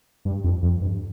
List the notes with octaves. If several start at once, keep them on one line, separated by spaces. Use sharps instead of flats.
G2
F2
F2
G2